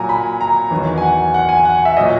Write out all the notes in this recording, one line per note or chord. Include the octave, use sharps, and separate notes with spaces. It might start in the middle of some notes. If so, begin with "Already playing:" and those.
Already playing: A#2 F#3 G#5 A#5
B5
A#5
E2 D#3 F#3
G#5
F#5
F#5
G#5
F#5
E5
A#2 F#3 D#5